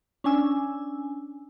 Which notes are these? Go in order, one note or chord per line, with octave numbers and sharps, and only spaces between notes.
C#4 D4 G#5 E6